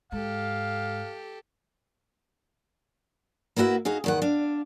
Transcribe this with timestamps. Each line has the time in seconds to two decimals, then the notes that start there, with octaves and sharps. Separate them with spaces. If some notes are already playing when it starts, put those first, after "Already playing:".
0.12 G#2 G4 A4 F5
3.56 A#3 B3 E4 F#4 E5
3.85 D#4 F#4 G#4 F5
4.04 E2 D#3 F#5
4.22 D4 F5